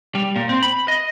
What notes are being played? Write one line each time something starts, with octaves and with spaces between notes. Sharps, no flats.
G3
A#2
C4
B5
D#5